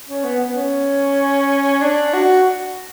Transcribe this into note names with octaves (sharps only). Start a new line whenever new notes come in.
C#4
B3
B3
C#4
D4
F#4